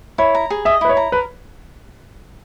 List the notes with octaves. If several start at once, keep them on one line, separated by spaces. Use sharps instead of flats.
E4 C#5
A#5
G#4
D#5 E5
E4 B4
C#5
A#5
A#4 B4